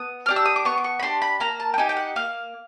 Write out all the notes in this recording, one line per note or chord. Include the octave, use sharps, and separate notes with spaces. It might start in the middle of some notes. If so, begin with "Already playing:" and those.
Already playing: B3 D#6
D4 G4 F6
E6
D#6
D6
B3 C#6
D6
C#6
B5
D4 G4 C6
B5
A#3 A#5
A5
G5
D#4 G4 G#5
G5
F#5
A#3 F5